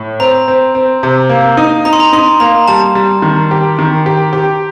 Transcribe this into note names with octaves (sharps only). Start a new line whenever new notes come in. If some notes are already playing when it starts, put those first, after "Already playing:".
Already playing: A2
C4 A#5
C4
C4
C3
A#3
D#4
D#4 A#5
C6
A#5
D#4 C6
A#3 A#5
G3 A5
G3
D#3
G4
D#3
G4
G4